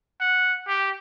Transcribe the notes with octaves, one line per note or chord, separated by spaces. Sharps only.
F#5
G4